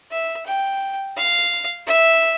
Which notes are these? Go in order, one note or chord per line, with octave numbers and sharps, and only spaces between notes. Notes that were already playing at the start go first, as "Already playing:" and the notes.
E5
G5
F5
E5